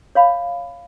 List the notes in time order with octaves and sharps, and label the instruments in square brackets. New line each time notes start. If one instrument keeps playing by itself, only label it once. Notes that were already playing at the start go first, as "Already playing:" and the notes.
[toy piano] C#5 F5 B5